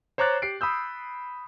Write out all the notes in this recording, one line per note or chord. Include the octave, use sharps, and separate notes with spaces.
C5 C#5 A#5 D6 F#6 A6
G4 C7 D7
B5 D#6 E6 G6